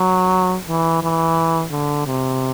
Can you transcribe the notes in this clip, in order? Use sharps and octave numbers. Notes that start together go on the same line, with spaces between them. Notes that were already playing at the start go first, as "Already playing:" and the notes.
Already playing: F#3
E3
E3
D3
C3